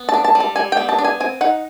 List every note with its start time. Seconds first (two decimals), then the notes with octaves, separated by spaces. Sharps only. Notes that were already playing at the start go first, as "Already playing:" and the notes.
Already playing: B3
0.09 A5
0.14 D4
0.24 A5
0.35 G3
0.40 A5
0.56 G3 G#5
0.72 B3 G5
0.89 A5
0.99 D4
1.04 G#5
1.20 C4 G#5
1.41 D#4 F#5